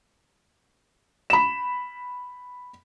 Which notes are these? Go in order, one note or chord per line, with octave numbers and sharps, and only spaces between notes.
B5 E7